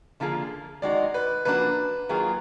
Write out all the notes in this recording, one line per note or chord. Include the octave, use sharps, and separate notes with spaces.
D3 F3 A#3 F4 G#4
D#3 G#3 D#4 F#4 D5
B4
F3 A#3 D4 F#4 B4
D#3 F#3 A#3 F4 G#4